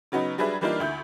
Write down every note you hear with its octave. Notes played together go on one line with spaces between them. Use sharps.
C#3 F#3 B3 D#4
F#3 G3 D4 G#4 B4 E5
E3 G3 A#3 D4 D#4 F4
D2 E4 G6